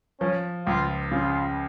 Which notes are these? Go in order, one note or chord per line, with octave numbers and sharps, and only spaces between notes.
F3 C#4
C#2 F4
C#3 F4